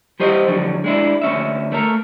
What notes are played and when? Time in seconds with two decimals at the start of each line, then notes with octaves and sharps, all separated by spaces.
0.20 G3 G4 C5 D#5
0.47 F2 D3 F#3 G3
0.84 G#3 D4 E4
1.22 D2 C#4 E5
1.72 A3 A4 A#4